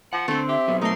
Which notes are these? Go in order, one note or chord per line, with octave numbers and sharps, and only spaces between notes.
F3 F#5
D3 A3 C4 C5
G4 E5
F#3 B3
A3 D#4 A#4 C6